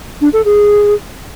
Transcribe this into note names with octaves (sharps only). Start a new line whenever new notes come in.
D4
A4
G#4